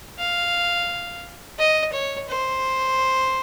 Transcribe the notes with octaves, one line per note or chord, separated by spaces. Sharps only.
F5
D#5
C#5
C5